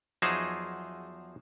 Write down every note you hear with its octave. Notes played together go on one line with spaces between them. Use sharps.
E2 F3 F#3 D#4 G#4 C5